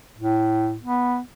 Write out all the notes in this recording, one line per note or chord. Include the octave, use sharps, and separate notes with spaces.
A2
B3